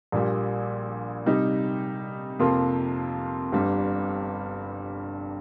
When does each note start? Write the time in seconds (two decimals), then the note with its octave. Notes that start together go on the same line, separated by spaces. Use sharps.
0.12 A#1 A#2 G3
1.26 C3 G3 D#4
2.39 F2 C3 F3 A#3 F4
3.52 G1 G2 G3